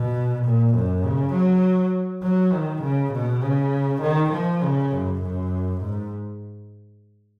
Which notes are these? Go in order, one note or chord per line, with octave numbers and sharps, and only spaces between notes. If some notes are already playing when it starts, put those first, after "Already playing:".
Already playing: B2
A#2
F#2
C#3
F#3
F#3
D#3
C#3
B2
C#3
D#3
F3
C#3
F#2
F#2
G#2